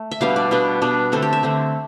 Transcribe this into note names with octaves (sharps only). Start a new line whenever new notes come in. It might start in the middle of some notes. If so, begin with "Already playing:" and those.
Already playing: A3
E5
B2 G3 B3 D4 F5
D5
B2 G3 B3 D4
B2 G3 B3 D4
D3 A3 C4 A4
G4
E5
D3 A3 C4